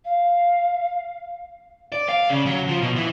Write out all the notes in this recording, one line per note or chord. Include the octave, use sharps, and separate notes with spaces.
F5
D5
F5
C#3
F#3
F3
B2
E3